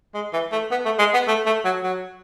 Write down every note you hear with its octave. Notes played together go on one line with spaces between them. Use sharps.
G#3
E3
A3
B3
A3
G#3
B3
A3
A3
F#3
F#3